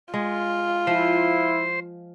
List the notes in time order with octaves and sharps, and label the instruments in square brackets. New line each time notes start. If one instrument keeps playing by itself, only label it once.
[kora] G#3 [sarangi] F4
[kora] F3 [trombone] E4 [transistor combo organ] C5